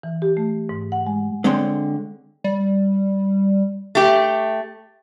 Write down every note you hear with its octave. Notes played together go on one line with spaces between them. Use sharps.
E3
G4
A3
G#2
F#5
G#3
D3 G#3 C4 C#5 C6
G3
A3 G4